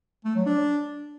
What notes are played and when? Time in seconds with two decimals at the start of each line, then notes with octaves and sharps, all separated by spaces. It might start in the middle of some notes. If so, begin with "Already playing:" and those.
0.25 A3
0.35 F#3
0.46 D4